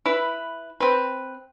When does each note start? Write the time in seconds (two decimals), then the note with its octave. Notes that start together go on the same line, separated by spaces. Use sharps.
0.06 E4 B4
0.80 C4 B4